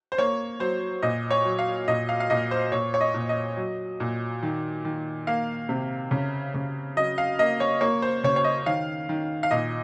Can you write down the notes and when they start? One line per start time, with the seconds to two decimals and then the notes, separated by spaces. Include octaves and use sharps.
0.12 C5
0.18 A#3 C#5
0.60 F#3 C5
1.02 A#2 D#5
1.30 C#5
1.45 F#3
1.59 F5
1.88 A#2 D#5
2.09 F5
2.20 F5
2.30 A#2 D#5
2.51 C5
2.72 A#2 C#5
2.94 C#5
3.01 D#5
3.14 A#2
3.29 D#5
3.57 F#3
4.00 A#2
4.43 D#3
4.85 D#3
5.27 A#3 F5
5.69 C3
6.11 C#3
6.54 C#3
6.96 F#3 D#5
7.18 F5
7.39 A#3 D#5
7.60 C#5
7.81 A#3 C#5
8.02 C5
8.24 C#3 C#5
8.36 C#5
8.44 D#5
8.66 D#3 F5
9.09 D#3
9.43 F5
9.51 A#2 D#5